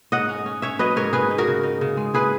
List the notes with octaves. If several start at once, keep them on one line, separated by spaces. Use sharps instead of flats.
G#2 D#5 F#5
C#4
C#4
C#4 C#5 E5
F#3 B4 D#5
G#2 A#4 C#5
D#4 G#4 B4
D#4
F#4 A#4
C#3
D#4
C#3
G#3
E4 G#4 B4